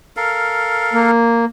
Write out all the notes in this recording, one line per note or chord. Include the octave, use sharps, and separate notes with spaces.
A4 A#4 F5
A#3